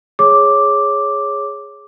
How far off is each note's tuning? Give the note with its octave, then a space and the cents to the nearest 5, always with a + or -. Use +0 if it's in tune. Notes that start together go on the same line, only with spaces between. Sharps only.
G#4 -5 C#5 +0 D6 +0